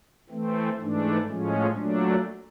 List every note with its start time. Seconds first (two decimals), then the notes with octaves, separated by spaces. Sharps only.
0.29 E3 A3 C4
0.79 G#2 E3 A3 D4
1.27 A2 F3 G#3 C#4
1.76 A#2 F#3 A3 D4